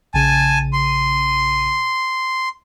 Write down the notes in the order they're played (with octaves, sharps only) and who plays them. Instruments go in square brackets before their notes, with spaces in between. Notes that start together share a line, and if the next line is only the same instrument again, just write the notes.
[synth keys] A#1 C#3 D#7 [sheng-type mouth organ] G#5 A5
[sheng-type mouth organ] C6